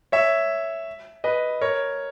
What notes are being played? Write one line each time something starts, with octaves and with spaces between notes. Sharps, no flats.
C#5 E5
B4 D#5
A#4 C#5